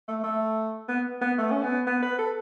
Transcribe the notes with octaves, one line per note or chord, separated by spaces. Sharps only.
A3
A3
B3
B3
A3
C#4
B3
B3
B4
A4